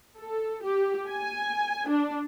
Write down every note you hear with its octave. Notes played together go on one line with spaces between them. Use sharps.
A4
G4
G#5
D4